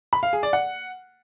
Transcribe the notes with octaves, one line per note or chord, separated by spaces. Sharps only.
B5
F5
G#4
D5
F#5